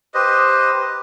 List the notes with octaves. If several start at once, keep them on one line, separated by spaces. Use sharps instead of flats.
G4 B4 C5 D#5